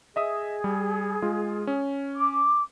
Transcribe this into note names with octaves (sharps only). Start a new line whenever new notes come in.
G#4 D#5 E5 D#6
G3
G#3 F4
C#4
D6